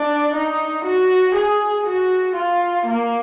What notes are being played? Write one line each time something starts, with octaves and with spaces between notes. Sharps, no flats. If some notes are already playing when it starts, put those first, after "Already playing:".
Already playing: D4
D#4
F#4
G#4
F#4
F4
A#3